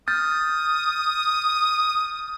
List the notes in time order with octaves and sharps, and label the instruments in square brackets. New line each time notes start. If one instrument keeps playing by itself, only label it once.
[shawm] D#6 [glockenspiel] F6 G6 A6